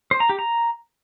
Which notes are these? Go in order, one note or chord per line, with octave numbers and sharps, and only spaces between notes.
C5
A#5
G4
A#5